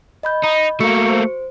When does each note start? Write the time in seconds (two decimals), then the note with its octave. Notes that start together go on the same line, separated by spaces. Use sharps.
0.23 D#5 B5 G6
0.43 D#4
0.80 A3 A#3 F#4 C#6 C#7
1.10 C5